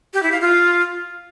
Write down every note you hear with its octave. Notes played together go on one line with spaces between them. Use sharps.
G4
E4
F5
F4